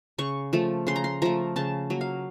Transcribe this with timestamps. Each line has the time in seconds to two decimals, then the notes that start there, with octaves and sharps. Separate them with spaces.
0.18 C#3 C#6
0.53 F3 A3
0.87 C#3 C6
0.96 A#5
1.04 C6
1.22 F3 A3 A#5
1.56 C#3 A5
1.90 F#3 A#3
2.01 F5